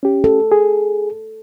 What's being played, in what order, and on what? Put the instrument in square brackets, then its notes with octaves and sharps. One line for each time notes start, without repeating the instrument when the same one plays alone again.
[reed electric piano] C#4 G4
[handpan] A4
[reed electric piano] G#4